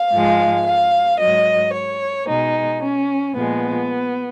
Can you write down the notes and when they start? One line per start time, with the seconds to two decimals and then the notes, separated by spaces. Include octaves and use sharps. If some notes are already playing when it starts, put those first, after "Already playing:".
Already playing: F5
0.12 G#2 F3 G#3
0.66 F5
1.20 G#2 F#3 D#5
1.74 C#5
2.27 B2 G#3 D#4
2.82 C#4
3.35 A#2 F3 G#3 B3